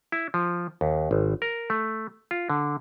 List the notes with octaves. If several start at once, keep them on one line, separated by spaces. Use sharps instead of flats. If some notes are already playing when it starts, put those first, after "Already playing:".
E4
F3
D#2
G#1
A#4
A3
F4
D3